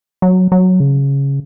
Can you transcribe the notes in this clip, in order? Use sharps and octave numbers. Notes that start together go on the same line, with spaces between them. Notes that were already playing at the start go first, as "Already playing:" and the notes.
F#3
F#3
C#3